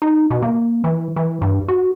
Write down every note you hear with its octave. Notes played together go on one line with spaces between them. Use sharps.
D#4
B2
A#3
E3
E3
G2
F#4